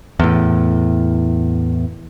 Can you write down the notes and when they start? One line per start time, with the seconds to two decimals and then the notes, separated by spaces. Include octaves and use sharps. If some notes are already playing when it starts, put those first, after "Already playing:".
0.20 E2 A2